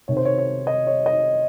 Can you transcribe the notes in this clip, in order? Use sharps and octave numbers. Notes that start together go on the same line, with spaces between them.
C3 D#3 C#5
C5
C#5
C#5
D#5
C#5
D#5